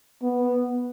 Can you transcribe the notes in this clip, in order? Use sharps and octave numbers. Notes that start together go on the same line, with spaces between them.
B3